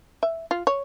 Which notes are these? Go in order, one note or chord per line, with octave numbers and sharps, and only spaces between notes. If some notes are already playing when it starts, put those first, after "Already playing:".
E5
F4
C#5